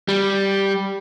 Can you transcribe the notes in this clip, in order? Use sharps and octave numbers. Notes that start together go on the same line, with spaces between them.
G3